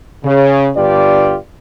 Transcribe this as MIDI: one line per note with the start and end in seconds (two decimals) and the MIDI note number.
0.24 0.69 49
0.76 1.36 31
0.76 1.36 62
0.76 1.36 65
0.76 1.36 67
0.76 1.36 71
0.76 1.36 74